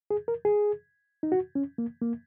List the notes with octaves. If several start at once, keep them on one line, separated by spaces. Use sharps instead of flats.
G#4
A#4
G#4
D#4
F#4
C#4
A#3
A#3